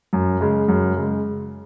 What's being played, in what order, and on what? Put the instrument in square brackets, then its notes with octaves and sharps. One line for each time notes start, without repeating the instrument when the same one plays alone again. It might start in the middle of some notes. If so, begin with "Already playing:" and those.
[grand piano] F#2
C#3 G#3
F#2
C#3 G#3